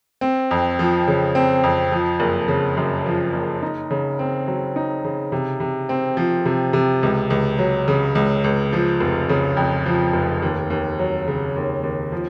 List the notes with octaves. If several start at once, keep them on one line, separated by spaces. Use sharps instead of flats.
C4
F2
F3
C#3
C4
F2
F3
F#1
C#3
F#2
F3
F#1
D#4
C#3
C4
F#3
D#4
C#3
C3
C3
C4
F3
C3
C3
C#2
C#2
F#3
C#3
C#2
C#2
F3
F1
C#3
F2
F3
F1
D#2
D#2
F#3
C#3
D#2
D#2
F3